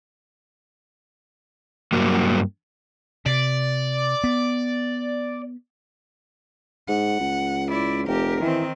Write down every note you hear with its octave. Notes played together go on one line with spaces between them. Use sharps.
G2 F#3 A#3
C3 D5
B3
G#2 F#5
C#2
E4 D5
F1 G4 A#4
D#3 E3 C4